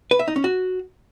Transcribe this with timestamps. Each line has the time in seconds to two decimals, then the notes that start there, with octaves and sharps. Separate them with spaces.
0.11 B4
0.19 E5
0.28 D#4
0.36 C#4
0.44 F#4